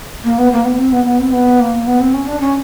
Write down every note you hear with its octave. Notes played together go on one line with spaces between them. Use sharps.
A#3
B3
A#3
B3
C4
B3
B3
C4
B3
A#3
B3
C4
C#4
D4
C#4